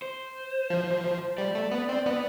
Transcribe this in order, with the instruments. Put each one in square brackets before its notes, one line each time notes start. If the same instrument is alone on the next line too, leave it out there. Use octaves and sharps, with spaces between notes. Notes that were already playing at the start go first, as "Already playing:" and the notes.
[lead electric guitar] C5
[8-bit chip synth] F3
[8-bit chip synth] G3 [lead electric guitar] D5
[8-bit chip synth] A3
B3
C4
B3